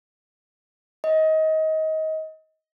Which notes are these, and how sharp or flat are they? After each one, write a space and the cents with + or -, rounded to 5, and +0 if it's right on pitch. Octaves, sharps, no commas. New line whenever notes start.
D#5 +25